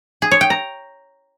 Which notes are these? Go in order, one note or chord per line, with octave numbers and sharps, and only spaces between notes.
G#4
C#5
G5
A#5